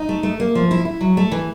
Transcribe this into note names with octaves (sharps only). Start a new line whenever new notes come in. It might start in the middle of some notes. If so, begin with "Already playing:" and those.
Already playing: D#4
A3
A3
A#3
F3
E4
E4
F#3
A3
E3